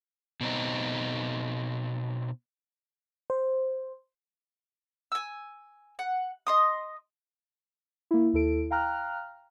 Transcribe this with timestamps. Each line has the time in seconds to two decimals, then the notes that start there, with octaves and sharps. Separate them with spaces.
0.41 B2 C4 D#4
3.30 C5
5.12 G#5 E6
5.99 F#5
6.47 D#5 C6 D#6
8.11 A#3 E4
8.33 D#2 E4 A4 D7
8.71 F5 G5 A#5 F6 F#6